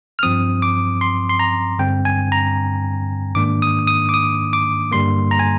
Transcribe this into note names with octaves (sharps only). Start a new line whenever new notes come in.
F6
G2 F3 C4 D#6
D6
C6
C6
A#5
G2 D3 G3 C4 G5
G#5
A#5
G#2 D#3 A#3 D4 D6
D#6
D#6
D6
D#6
D6
G2 D3 G3 A#3 C6
A#5
G#5